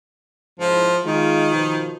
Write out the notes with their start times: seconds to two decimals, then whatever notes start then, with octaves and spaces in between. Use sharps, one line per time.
0.59 G#2 C#3 F3 E4
1.04 D#3 G#3 F4
1.52 B2 F3